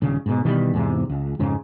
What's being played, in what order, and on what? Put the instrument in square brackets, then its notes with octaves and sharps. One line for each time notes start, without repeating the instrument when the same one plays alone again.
[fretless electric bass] D#1 C#3
G#2 B2
B2 D#3 E3 G3
E2 G#2 C3
C#2
F2 G#2 C#3